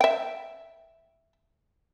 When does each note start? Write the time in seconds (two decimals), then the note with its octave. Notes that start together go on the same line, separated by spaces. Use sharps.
0.01 E5 G5